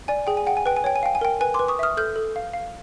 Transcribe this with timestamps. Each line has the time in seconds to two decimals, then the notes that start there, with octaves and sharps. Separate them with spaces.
0.08 D5 G#5
0.27 G#4 G5
0.37 G#5
0.47 F#5 G5
0.57 G#5
0.66 B4 G5
0.77 G#5
0.84 C#5 G5
0.96 G#5
1.03 F5 G5
1.15 G#5
1.21 A#4 G5
1.41 B4 G#5
1.54 B4 C6 D6
1.68 C#6 D#6
1.79 E5 D#6 F6
1.97 A4 F6 G6
2.16 A4
2.36 F5
2.54 F5